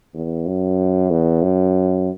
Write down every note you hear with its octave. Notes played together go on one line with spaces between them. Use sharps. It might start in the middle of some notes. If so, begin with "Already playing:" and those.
E2
F#2
E2
F#2